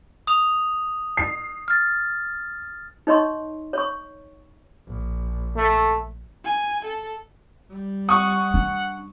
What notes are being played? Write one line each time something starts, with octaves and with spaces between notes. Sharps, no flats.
D#6 F7
C7
F6 A6
D#4 C#5 D#5 C6 C#6
C#5 C#6
A#1
A3
G#5
A4
G3
F#5 C#6 D#6
D4